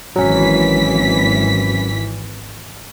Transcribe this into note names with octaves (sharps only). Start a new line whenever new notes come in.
G#1 E3 F#3 C#4 B6